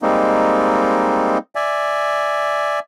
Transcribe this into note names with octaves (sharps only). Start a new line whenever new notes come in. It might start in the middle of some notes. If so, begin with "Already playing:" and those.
G3 G#3 A#3 C4 D#4
D5 E5 G#5